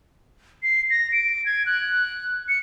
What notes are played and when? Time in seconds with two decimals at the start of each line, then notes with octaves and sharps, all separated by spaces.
0.63 C7
0.90 A#6
1.12 D7
1.46 G#6
1.66 F#6
2.49 C#7